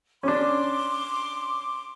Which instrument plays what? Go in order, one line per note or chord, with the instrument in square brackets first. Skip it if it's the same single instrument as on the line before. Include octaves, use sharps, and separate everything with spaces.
[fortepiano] C#4 D4 [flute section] C6 D6